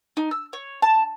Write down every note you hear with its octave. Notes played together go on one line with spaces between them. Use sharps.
D#4
E6
C#5
A5